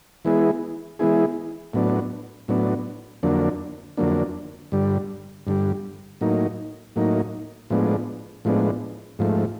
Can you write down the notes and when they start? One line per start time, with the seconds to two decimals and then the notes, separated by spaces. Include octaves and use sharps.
0.25 E3 G#3 B3 E4 G#4
0.99 E3 G#3 B3 E4 G#4
1.73 A2 F#3 B3 D4
2.48 A2 F#3 B3 D4
3.23 F2 D3 F#3 A#3 D4
3.97 F2 D3 F#3 A#3 D4
4.72 G2 D3 G3
5.47 G2 D3 G3
6.21 A2 F#3 A#3 D#4
6.96 A2 F#3 A#3 D#4
7.70 A2 F3 G#3 B3 D4
8.45 A2 F3 G#3 B3 D4
9.19 G#2 F3 A3